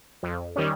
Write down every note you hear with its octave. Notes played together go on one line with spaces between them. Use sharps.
F2
D#3 G3 C#4